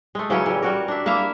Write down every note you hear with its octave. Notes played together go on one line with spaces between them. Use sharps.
G#3 A3
C#3 E3 F#3 C#4
E3 G3
G3 F#4 A#4
D4 E5
A#3 E4 E5 F5